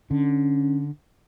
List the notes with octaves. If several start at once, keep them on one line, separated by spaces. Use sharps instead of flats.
D3 C#4